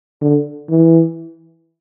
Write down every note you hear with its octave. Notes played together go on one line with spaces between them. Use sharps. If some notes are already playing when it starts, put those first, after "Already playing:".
D3
E3